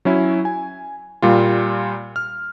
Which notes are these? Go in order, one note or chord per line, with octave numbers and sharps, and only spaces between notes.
F#3 C#4 E4
G#5
A#2 G3 F4
F6